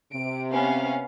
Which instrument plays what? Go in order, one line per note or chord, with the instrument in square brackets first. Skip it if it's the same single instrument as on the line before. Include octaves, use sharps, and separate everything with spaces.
[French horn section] C3 [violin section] D7
[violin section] B3 C#4 F5